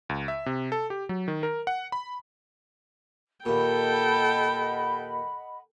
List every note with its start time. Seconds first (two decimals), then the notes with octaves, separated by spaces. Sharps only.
0.09 C#2
0.28 E5
0.46 C3
0.72 A4
0.90 G4
1.09 F#3
1.28 D#3
1.43 A#4
1.67 F#5
1.92 B5
3.45 D#2 A#2 A4 D#5 F#5 G5 B5